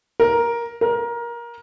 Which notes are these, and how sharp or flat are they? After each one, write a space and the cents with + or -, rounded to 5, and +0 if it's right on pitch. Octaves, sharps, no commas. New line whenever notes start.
A#4 +10
A#4 +20